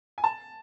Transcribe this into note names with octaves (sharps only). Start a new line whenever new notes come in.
G#5
A5